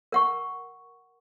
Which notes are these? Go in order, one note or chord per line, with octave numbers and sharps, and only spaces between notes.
A#4 F#5 C#6